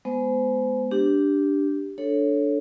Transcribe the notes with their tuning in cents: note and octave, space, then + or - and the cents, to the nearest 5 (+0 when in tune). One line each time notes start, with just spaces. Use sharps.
G#3 +20 B3 +0 C5 -30
D4 -5 G4 +0
D4 +0 A4 +0 C#5 +0